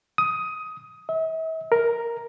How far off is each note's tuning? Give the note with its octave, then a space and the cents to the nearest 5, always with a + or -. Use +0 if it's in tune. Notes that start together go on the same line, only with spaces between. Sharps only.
D#6 +15
E5 -40
A#4 +5